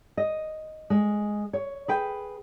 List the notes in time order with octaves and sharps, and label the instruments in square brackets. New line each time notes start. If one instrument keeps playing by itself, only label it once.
[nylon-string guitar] D#5
G#3
C#5
G#4 B4 G5